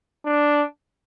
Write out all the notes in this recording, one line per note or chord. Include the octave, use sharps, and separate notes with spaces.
D4